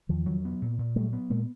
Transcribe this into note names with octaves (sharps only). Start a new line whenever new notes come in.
E2 D#3 F3
F#3
B3
A#2
A#2
F#3 G3 A3
B3
A#2 G#3 A#3